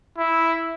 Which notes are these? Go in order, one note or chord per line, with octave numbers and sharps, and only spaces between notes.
E4